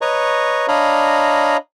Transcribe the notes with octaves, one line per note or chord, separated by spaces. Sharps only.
B4 C#5 D#5 A#5 C#6
D4 C#5 D#5 F5 A#5 B5